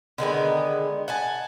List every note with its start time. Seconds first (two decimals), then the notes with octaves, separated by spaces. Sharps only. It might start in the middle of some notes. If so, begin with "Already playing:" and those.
0.18 D3 D#3 G#3 B3
1.08 F#5 G#5 A5